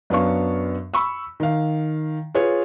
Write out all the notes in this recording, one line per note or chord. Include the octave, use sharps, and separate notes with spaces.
F#2 B3 D4 F5 C#6
B5 C#6 E6
D#3 F5
F4 G#4 B4 C#5